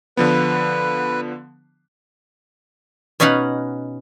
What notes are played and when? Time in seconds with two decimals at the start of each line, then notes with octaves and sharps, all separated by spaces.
0.17 D3 F3 B3 B4
3.20 B2 C#4 D#4 B4 F5 F#5